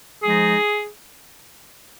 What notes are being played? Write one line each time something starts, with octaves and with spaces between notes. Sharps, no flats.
F3 G#3 D#4 G#4